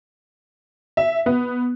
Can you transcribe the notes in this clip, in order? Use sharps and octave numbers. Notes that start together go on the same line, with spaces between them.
E5
B3